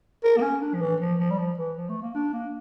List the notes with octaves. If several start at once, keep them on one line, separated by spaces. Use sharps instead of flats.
A#4
A#3
C#4
D4
F3
E3
F3
F3
G3
F3
E3
F3
A3
A#3
D4
A#3